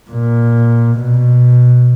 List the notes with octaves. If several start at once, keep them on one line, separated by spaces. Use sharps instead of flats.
A#2
B2